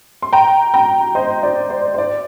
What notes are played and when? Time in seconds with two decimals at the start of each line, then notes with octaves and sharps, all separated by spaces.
0.22 C6
0.33 G5 A#5
0.74 G5 A#5
1.15 C5 D#5
1.43 D5
1.70 C5
1.94 C5
1.98 D5